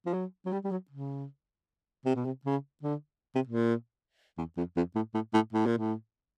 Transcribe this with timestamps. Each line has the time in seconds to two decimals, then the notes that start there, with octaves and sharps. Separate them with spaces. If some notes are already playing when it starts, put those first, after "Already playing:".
0.06 F3
0.14 F#3
0.46 F#3
0.53 G3
0.64 G3
0.71 F#3
0.91 C#3
2.06 C3
2.15 B2
2.25 C3
2.45 C#3
2.83 D3
3.35 C3
3.47 A#2
4.38 E2
4.57 F2
4.77 F2
4.96 A2
5.14 A2
5.34 A2
5.53 A2
5.66 A#2
5.78 A2